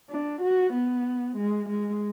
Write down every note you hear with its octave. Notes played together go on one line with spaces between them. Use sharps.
D4
F#4
B3
G#3
G#3